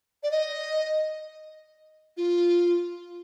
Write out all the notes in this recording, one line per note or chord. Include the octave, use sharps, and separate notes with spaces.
D5
D#5
F4